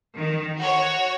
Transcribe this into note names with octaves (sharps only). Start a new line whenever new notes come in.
D#3
F#4 C#5